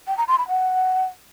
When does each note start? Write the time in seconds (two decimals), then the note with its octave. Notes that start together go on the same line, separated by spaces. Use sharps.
0.07 G5
0.17 A#5
0.28 C6
0.38 B5
0.48 F#5